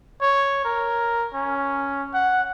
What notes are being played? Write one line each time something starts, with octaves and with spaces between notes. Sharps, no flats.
C#5
A#4
C#4
F#5